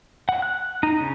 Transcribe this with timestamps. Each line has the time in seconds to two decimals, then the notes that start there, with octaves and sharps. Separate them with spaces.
0.29 F#5
0.42 F#6
0.83 D#4
1.00 C#3